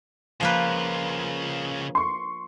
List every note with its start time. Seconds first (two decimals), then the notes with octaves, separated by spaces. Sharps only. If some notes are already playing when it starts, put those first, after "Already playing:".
0.41 C#3 F3 A#3 F4 B4
1.95 C6 C#6